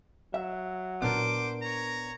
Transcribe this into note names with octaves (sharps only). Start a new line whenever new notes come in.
F#3 E5
A#2 B3 D4 E4 A#4 C5 D6
C#5 A#5